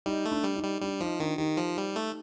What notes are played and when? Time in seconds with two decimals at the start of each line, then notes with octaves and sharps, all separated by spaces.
0.06 G3 D#4
0.25 A3
0.32 D4
0.43 G3
0.56 D#4
0.63 G3
0.81 G3 D4
1.00 F3 D#4
1.20 D#3 D4 F4
1.38 D#3 D#4 G4
1.57 F3
1.78 G3
1.96 A3